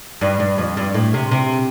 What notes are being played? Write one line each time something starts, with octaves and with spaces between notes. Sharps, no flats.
G2
G2
F2
G2
A2
C3
C3